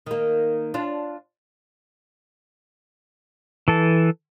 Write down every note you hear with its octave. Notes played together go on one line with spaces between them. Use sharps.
D#3 A#3
D4 F4
E3 A4 A5